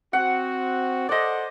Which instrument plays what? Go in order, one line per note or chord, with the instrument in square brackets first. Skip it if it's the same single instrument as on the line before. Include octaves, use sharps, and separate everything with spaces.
[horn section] C4 F#4 [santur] F#5
[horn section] A4 C5 F#5 [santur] D5 D#5